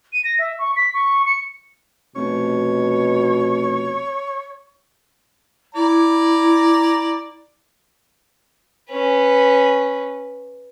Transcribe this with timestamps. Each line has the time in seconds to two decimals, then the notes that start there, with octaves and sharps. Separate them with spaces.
0.13 D#7
0.24 A#6
0.39 E5
0.59 C#6
0.76 B6
0.94 C#6
1.26 C#7
2.16 F1 B2 C#5
5.75 E4 D5 A#5
8.90 C#4 B4